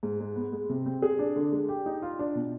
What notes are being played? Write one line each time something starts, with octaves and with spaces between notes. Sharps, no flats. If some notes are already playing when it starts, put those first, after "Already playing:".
G#2
G#3
B3
G#3
C3
C4
G#4
D4
D3
G#3
G4
D#4
F4
D4
B2